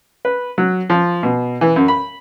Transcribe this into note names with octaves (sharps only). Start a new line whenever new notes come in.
B4
F#3
F3
B2
E3
F#2
B5